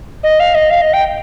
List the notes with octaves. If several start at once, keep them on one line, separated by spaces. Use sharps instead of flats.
D#5
F5
D#5
F5
D#5
G5